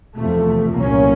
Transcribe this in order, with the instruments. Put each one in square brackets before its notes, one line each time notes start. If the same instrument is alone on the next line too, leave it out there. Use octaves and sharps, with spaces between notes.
[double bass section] E2 C3 F3 A3
C2 A#2 F#3 A#3 C#4